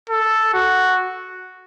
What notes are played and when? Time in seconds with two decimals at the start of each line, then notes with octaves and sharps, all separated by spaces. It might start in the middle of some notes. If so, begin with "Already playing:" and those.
0.10 A4
0.54 F#4